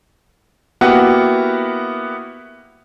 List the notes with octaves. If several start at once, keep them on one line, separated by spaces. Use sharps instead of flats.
A#3 B3 E4 F#4 G4 F#5